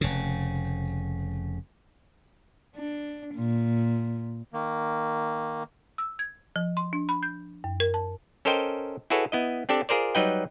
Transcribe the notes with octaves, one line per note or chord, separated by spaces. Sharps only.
F1 C#3
D4
A#2
D#3 A#3
E6
G#6
F3
C6
D4
B5
G6
F#2
A#4
A5
C#4 A4 A#4 C5 D#5 G5
E4 F#4 G#4 A4 B4 C#5
B3 E4 D#5
C4 D4 G4 A4 D5
F4 G#4 A#4 C5 D5
F#3 G3 D#4 B4 D#5 G5